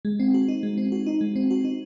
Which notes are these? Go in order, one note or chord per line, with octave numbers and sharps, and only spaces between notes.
G#3
C4
F#4
D#4
G#3
C4
F#4
D#4
G#3
C4
F#4
D#4